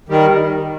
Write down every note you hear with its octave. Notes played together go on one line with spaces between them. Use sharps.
D#3 G3